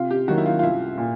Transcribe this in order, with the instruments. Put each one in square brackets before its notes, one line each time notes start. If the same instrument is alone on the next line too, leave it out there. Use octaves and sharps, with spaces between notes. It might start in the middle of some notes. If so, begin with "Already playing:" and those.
Already playing: [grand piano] C3 [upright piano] F4
[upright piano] G4
[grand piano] D#3 F#3 A#3 D#4 [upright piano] F#4
[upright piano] E4
F4
F4
[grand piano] C2 [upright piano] E4
[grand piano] A#2